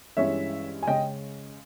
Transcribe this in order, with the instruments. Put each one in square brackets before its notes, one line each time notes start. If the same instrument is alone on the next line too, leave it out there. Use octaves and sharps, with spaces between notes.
[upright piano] G2 E3 G#3 C#4 C#5 E5
G#5
C#3 G#3 C#4 D#5 G5